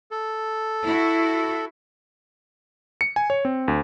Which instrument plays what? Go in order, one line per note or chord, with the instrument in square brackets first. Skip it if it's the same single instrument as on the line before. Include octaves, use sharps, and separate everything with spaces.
[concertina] A4
[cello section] E4 F#4
[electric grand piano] C#7
G#5
C#5
C4
D2